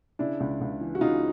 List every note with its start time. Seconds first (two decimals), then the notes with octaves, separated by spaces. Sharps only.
0.19 C#3 D4 E4
0.40 C#2
0.61 C#2
0.81 E3
0.95 F#4
1.01 C#3 D#4 F4